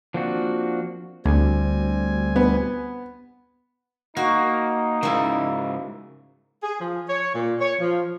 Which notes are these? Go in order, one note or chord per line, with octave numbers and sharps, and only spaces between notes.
F3 A#3 C4 D4 F#4
D2 G3 C4 G#5
B3
A#3 D#4 F#4
G#2 C#3 A#3 E4
G#4
F3
C#5
A#2
C#5
F3